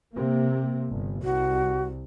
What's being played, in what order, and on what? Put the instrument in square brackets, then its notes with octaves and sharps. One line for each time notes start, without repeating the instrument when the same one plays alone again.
[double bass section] C3 A#3
G1
[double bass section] C2 [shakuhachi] F#4